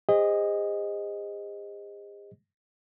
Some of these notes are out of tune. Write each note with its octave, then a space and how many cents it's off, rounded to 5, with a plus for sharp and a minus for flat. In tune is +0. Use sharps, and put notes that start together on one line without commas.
G#4 -45 C5 +0 D#5 +0